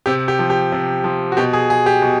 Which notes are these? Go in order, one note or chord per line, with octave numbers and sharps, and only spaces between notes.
C3 G4
G4
F3
G4
C3
F3
F#4
B2 G4
G#4
G#4
G4
B2